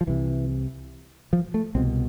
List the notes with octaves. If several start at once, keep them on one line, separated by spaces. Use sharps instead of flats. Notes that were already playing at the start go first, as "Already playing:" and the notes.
F3
C2 C3 E3
F3
A3
C2 B2 C4